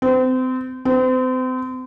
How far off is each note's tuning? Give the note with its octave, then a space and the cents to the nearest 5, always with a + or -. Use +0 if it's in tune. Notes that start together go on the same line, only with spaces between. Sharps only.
C4 -30
C4 -35